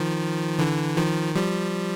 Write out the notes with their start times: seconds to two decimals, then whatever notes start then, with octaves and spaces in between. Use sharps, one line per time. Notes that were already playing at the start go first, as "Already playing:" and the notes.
Already playing: D#3 F3
0.59 D3 E3
0.97 D#3 F3
1.35 F3 G3